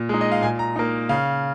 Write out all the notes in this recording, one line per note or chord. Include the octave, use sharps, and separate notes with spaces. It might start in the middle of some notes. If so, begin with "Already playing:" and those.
Already playing: A#2
G#3 D#4
D#5
F5
A#2 G#5
A#5
A#3 D#4
C#3 F5